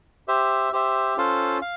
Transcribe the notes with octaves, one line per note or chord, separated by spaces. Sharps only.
G4 C5 E5
G4 C5 E5
C#4 F4 A4 C5 F5
F5